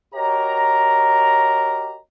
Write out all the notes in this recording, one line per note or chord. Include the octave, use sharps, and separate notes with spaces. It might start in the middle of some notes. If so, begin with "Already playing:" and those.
F#4 G4 A#4 C#5 D#5 A#5